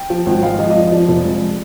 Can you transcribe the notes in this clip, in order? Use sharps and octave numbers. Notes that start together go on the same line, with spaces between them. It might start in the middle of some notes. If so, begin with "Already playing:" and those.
Already playing: G5
F3
G#1
G#3 F5
F3 D#5
D#5
F2 D5
F3 D5
F1
G#3